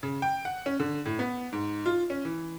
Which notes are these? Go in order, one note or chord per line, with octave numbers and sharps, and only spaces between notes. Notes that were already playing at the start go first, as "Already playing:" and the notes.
C#3
G5
F#5
C#4
D3
A2
B3
G#2
F4
C#4
E3